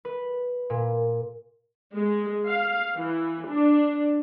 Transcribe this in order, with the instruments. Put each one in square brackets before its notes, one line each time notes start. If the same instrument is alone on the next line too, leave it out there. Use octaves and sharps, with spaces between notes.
[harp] B4
A#2
[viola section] G#3
F5
E3
D4